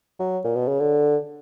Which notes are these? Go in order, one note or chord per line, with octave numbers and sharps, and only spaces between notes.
F#3
A#2
B2
C#3
D3